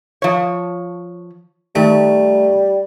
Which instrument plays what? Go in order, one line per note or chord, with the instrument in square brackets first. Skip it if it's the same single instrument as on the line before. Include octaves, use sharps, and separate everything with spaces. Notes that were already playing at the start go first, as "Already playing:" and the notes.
[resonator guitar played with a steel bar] F3 C#5
[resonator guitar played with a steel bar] D#3 [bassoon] G3 [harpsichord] A3